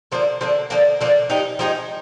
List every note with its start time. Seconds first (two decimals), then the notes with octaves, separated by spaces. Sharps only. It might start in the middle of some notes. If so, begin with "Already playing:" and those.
0.12 D3 F3 A#3 D4
0.41 D3 F3 A#3 D4
0.70 D3 F3 A#3 D4
1.00 D3 F3 A#3 D4
1.30 F3 G#3 D#4 G4
1.59 F3 G#3 D#4 G4